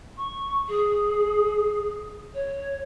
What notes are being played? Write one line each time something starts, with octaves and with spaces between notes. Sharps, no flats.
C#6
G#4
C#5